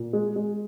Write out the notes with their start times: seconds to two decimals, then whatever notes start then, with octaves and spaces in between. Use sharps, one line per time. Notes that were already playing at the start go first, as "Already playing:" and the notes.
Already playing: A#2
0.13 G#3
0.36 G#3